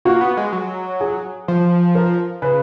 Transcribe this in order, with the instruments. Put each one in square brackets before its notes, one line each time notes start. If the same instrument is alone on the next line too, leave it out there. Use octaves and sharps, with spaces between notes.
[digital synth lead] A#3 [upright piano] F#4
[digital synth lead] B3
G#3
F#3
[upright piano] G#4
[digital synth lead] F3
[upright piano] A#4
[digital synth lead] C#3 [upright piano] B4